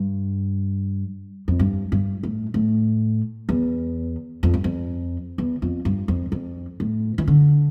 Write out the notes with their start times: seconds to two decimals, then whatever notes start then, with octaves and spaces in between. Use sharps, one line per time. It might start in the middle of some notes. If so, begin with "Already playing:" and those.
Already playing: G2
1.48 F2
1.59 G2
1.92 G2
2.23 A2
2.54 A2
3.49 E2
4.43 F2
4.54 G2
4.64 F2
5.38 E2
5.62 F2
5.85 G2
6.08 F2
6.32 F2
6.80 A2
7.18 E3
7.28 D3